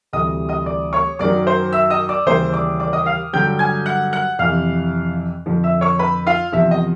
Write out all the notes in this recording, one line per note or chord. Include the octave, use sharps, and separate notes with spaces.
D2 C3 E3 G3 D#5 D#6
D#5 D#6
D5 D6
C#5 C#6
F#2 D#3 F#3 D5 D6
C5 C6
E5 E6
D#5 D#6
D5 D6
D#2 C#3 E3 G3 C5 C6
D5 D6
D5 D6
D#5 D#6
F5 F6
G2 D3 F#3 G5 G6
G#5 G#6
F#5 F#6
F#5 F#6
F2 C3 E3 F5 F6
F2 D3 F3
E5 E6
C#5 C#6
B4 B5
F4 F5
E2 C3 F3 E5
D#5